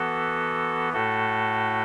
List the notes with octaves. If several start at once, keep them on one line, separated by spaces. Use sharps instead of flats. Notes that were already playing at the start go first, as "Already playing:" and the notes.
Already playing: E3 B3 F#4 A4
A2 A3 F#4 A4